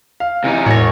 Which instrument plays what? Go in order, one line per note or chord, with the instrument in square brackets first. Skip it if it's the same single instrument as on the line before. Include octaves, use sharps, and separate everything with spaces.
[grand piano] F5
[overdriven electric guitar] C3 D#4 [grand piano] E3
[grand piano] E1 A#6 [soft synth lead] A2 [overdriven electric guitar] C#5